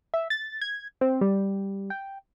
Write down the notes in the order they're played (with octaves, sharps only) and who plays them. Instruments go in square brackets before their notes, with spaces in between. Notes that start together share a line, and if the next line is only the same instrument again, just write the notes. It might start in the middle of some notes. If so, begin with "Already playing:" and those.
[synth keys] E5
A6
G#6
C4
G3
G5